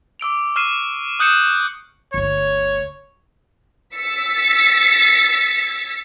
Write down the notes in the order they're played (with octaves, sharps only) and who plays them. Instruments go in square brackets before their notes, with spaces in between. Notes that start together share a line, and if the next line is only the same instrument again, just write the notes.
[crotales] D6 E6 D7 F7
C#6 E6 F6 C7 D#7 E7
D#6 F#6 G6 C#7 E7
[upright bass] G1 D2 [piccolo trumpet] C#5
[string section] E6 A6 B6 C#7